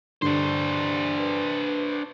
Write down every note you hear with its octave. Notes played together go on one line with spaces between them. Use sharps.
G2 D3 D4 C5
B4